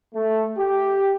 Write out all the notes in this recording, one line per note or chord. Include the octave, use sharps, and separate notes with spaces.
A3
G4